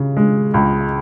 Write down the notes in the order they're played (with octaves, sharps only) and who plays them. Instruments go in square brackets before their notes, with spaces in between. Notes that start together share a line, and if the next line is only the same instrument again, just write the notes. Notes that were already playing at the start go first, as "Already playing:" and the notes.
Already playing: [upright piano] C#3
G#3
C#2